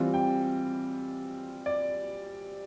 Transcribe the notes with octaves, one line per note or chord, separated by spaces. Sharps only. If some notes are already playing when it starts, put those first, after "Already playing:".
Already playing: E3 G3 C4 F4
G5
D5